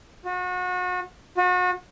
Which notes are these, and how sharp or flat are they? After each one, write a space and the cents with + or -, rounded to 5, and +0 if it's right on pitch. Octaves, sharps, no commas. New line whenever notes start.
F#4 -35
F#4 -35